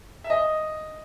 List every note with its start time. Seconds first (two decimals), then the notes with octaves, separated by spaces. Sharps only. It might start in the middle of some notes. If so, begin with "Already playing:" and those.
0.24 E5
0.30 D#5